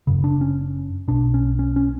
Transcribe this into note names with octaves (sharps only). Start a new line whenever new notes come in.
F#1 F#2 C#3
D4
C#4
B1 B2 D4
C#4
C#4
C#4